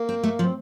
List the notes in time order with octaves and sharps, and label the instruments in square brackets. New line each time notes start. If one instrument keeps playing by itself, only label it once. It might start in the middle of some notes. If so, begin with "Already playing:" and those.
Already playing: [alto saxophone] A#3
[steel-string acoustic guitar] C4
A3
F3
[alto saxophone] C4